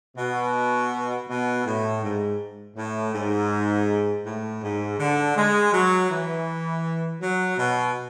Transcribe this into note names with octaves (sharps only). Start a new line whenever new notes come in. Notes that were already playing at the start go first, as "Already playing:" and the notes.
B2
B2
A2
G#2
A2
G#2
A2
G#2
D3
G#3
F#3
E3
F#3
B2